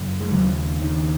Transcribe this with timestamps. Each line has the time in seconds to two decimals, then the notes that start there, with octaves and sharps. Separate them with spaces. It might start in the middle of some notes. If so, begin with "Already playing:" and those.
Already playing: F#2 C#3
0.20 G#3
0.32 D#2 C#3 F#3
0.80 D#3